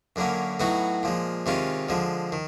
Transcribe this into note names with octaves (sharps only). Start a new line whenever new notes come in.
F#2 D3 F#3 A#3 C#4
A2 F#3 B3 D#4 F#4
A#2 F3 G#3
C3 D#3 G#3 C#4 F4
D3 F3 G#3
D#3